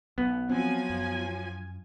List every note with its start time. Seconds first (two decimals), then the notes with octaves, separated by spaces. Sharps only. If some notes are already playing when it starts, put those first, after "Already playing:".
0.18 B1 B3
0.49 F3 F#3 C4 G#5
0.89 F#2